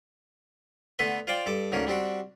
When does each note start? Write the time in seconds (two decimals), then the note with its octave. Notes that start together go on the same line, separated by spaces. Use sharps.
0.99 D3 A3 B3 B4 C6
1.27 F4 C5 D5 F5 G5
1.46 G2 A4 D6
1.72 D2 G#2 A#3 C#4 D4
1.87 G3 C4 D4 F#4